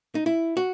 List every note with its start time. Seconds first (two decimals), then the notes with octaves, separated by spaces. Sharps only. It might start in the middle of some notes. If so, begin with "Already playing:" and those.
0.15 D#4
0.26 E4
0.57 F#4